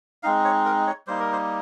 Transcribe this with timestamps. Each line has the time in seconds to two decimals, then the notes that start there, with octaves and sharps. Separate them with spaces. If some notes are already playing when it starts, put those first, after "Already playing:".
0.23 G#3 C4 D#4 F5
0.45 C#5
0.65 A#4
0.87 C#5
1.07 G3 A#3 D#4 C5
1.20 A#4
1.32 C5